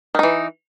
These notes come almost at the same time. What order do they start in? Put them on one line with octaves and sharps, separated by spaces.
D#3 D#4 E3